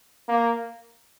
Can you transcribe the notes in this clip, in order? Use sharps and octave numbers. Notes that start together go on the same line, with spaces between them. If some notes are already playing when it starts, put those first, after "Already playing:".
A#3